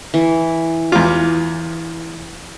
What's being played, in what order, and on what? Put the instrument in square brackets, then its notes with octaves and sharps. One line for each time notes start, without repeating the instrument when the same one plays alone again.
[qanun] E3
[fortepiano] E2 F4 [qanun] D6